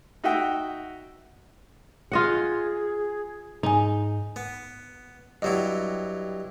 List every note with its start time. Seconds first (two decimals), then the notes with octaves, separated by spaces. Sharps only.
0.24 D#4 F#4 E5 F#5 G5
2.12 F4 G#4 D#5 F#5
3.63 G#2 D#4 G#5
4.36 B3
5.42 G2 F#3 E4 G4 D#5